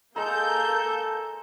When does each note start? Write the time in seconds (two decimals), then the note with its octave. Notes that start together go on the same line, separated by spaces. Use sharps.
0.16 G#3 A#3 A4 A#5 G6